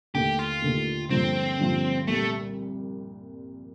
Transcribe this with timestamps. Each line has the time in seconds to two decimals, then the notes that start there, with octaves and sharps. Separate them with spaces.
0.14 D#2 D3 A3 G4
0.39 F4
0.62 D#2 D3 A3
1.10 G2 D3 F3 A#3 C4 F4
1.59 G2 D3 F3 A#3 F4
2.07 C2 A#2 G3 A3